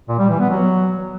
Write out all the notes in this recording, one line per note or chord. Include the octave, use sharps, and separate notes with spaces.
A#2
G3
E3
B3
F#3